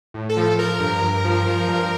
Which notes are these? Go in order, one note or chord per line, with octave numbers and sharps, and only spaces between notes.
A2
A4
F3
F3 A#4
G2
G2
F3
F3
G2